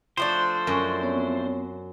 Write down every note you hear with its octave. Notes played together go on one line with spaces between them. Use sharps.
F3 A3 D4 C5
F#2 C#6
B3 C4 C#5